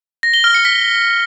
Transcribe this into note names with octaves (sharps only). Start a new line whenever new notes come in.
A#6
G7
F6
C#7
B6